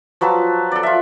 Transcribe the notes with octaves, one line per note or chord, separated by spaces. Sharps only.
F3 F#3 B4 A5
A4 D5
F4 E5